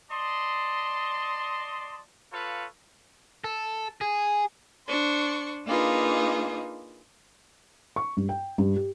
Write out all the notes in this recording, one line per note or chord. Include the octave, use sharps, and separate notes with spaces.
D5 D#5 A5 C6
F4 A4 B4 C#5 F5
A4
G#4
D4 C5 C#6
A#3 D4 D#4 F4 G#4 B4
C#6
G2
G5
G2
G4